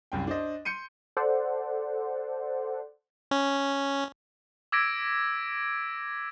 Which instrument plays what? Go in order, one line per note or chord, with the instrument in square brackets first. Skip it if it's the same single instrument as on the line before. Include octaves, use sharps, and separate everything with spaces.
[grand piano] C2 F#2 G5
D4 C5 D#5
C6 G6 C#7 D#7
[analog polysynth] A4 C5 D5 F#5
[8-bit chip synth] C#4
[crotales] D6 E6 G#6 A#6 B6 D7